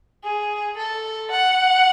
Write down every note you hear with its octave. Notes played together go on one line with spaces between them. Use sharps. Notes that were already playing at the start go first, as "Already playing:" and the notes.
G#4
A4
F#5